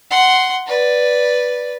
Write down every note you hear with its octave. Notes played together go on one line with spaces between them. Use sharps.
F#5 C6
B4 D5